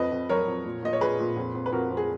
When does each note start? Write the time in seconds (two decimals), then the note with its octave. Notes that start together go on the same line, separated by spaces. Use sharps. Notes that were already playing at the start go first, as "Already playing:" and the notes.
Already playing: F2 B4 D#5
0.11 F2
0.29 F#3 A#4 C#5
0.47 F2
0.65 A#2
0.83 A#2 D#5
0.93 C#5
1.01 A#2 G#4 B4
1.19 A#2
1.37 F2
1.55 F2
1.66 B4
1.72 F2 F#4 A#4
1.91 F2
1.97 G#4